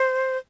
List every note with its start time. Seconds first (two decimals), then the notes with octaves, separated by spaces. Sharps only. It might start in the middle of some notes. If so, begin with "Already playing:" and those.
Already playing: C5